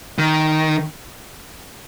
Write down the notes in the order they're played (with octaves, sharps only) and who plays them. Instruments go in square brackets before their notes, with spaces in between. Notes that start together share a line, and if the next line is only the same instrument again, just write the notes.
[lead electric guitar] D#3